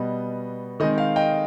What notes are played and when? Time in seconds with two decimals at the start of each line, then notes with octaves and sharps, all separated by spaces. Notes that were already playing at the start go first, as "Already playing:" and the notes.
Already playing: B2 G3 B3 D#5
0.80 D#3 G#3 C4 D#5
0.98 F5
1.16 D#5 G5